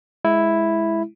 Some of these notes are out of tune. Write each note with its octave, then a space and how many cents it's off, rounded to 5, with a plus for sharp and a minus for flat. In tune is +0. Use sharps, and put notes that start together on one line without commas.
G#3 +15 E4 +0